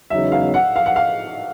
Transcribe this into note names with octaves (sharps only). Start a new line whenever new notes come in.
E2 C#3 F#3 B3 D#4 E5
F5
F#5
F5
F#5
F5